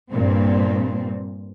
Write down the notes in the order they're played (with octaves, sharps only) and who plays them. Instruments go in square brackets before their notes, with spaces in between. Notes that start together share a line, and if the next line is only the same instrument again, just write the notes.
[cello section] G2 A#2 C4